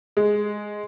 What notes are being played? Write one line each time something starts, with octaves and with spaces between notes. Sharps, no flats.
G#3